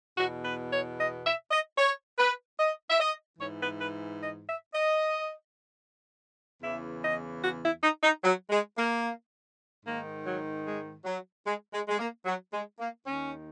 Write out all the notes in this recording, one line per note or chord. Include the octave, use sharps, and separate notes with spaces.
E2 B2 F#4
B4
C#5
D#5
E5
D#5
C#5
B4
D#5
E5
D#5
G#2 E3 C#5
B4
B4
D#5
E5
D#5
E2 C#3 E3 E5
D#5
F#4
E4
D#4
D#4
F#3
G#3
A#3
G#2 D#3 A#3
F#3
G#3
F#3
G#3
G#3
G#3
A#3
F#3
G#3
A#3
D#2 D#3 C#4